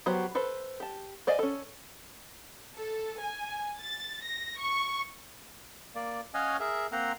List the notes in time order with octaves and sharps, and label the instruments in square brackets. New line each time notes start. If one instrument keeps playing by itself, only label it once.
[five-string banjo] F#3 B3 F#4 G4 C5
A4 B4 C5
G4 A5
C5 D5 D#5 F5 G#5
C#4 A4
[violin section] A4
G#5
A6
A#6
C#6
[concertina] A#3 D5
C#4 C#5 D#5 F5 F#5 G#5
G#4 A#4 E5
A#3 C4 C5 F#5 A#5